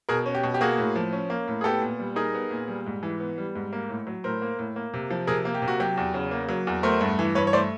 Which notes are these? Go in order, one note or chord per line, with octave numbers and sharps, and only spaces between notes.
B2 G#4 A#4
C#4
G4
B2
G4
A#3 F#4 G#4
A2
F3
C#4
A#3
A2
G#4
B3 G4 A4
A#2
G3
D#4 G#4 A#4
B3
A#2
G3
G#2
E3
B3
G3
G#2
A#3
A2
F#3
A2 A#4 C5
A#3
A2
A#3
C3
F3
C3 G#4 A#4
A#3
G4
C3
F#4
F#3 G4
E2
C#3
A#3
F#3
E2
A3 A#4 C5
G2
E3
G2 B4 C#5
C#5
A3 C5 D5